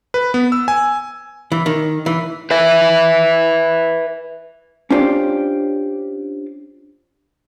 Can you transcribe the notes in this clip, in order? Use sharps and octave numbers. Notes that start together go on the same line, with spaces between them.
B4
B3
E6
G#5
E3
D#3
E3
B4 E5
C#4 D4 F4 G4 C5 D5